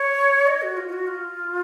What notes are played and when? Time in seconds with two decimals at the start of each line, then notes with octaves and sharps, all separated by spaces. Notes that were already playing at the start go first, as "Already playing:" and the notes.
Already playing: C#5
0.47 D#5
0.62 F#4
0.77 F4
0.88 F4
0.93 F#4
1.07 F4